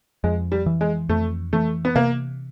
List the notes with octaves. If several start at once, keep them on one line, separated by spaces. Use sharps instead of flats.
F2 G#3
G3
E3
G#3
F2 A3
E3 A3
B3
C3 A#3